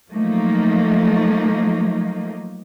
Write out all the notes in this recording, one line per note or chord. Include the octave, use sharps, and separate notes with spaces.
F3 F#3 A3 A#3 D#4